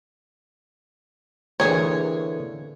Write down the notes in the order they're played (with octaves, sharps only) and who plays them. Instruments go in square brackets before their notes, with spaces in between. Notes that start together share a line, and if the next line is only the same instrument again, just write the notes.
[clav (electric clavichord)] D3 E3 A#3 [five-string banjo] G#4 C#5